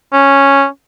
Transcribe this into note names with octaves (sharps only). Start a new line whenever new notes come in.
C#4